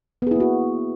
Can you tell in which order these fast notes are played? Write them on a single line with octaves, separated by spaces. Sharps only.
B3 G#4 E4 A#3 F#4